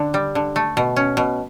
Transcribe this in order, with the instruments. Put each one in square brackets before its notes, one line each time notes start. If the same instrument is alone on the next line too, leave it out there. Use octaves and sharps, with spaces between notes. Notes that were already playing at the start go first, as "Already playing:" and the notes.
Already playing: [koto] D3 D4
G3
D3
A3
B2
C#4
B2